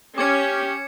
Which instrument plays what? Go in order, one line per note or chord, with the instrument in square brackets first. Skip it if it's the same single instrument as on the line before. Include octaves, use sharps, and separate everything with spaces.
[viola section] C#4 [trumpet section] G4 [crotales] D6 G#6 C#7